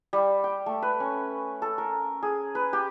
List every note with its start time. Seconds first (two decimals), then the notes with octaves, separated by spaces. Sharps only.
0.13 G3
0.44 G5
0.66 A3
0.82 B4
1.00 C#4
1.62 A4
1.78 A#4
2.23 G#4
2.55 B4
2.73 G4